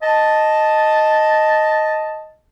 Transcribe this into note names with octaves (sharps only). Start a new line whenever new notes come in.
D#5 A5